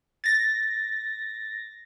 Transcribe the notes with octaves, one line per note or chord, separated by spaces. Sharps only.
A6 A#6